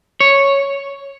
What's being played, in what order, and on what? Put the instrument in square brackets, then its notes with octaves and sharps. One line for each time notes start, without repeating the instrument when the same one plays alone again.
[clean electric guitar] C#5